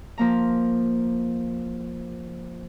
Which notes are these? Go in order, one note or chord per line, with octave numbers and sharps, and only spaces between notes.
F3 A#3 A#5